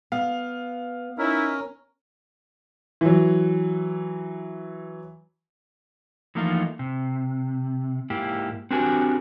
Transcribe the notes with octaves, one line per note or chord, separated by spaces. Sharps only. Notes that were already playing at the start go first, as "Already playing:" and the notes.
B3 F5
C#4 D#4 E4 A#4
E3 F#3
E3 F3 A3 A#3 D#4 F4
C3
G#2 A#3 E4 G4
C4 D4 F#4 G4 A#4 G#5